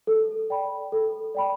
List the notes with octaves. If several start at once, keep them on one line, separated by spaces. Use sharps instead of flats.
A4
D5 G5 B5
A4
D5 G5 B5